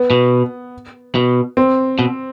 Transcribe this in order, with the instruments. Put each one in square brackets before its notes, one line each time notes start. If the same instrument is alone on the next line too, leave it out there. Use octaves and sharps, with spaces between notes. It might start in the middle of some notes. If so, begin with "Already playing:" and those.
Already playing: [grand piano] B3
[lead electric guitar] B2
B2
[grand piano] C4
[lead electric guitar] B2